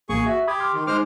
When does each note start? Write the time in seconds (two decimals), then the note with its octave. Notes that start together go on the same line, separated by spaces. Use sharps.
0.09 A1 A#3 G#4 C#6
0.26 F#4 E5
0.48 G4 B5 D#6 G#6
0.60 C6 D6 F6
0.74 D#3
0.87 G#3 D#4 C5 D6 F6